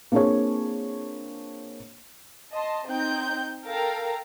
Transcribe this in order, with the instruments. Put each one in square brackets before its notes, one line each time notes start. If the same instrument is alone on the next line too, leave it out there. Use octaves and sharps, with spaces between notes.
[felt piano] A#3 C4 D4 F4 G#4 C#5
[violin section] D#5 A5 C6
C4 D#4 G5 G6
A4 A#4 F5 G5 A5 A#5